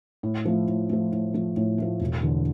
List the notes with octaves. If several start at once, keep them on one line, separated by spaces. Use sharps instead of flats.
A2
F3 A3
A2
F3 A3
A2
F3 A3
A2
F3 A3
E1
E2 D3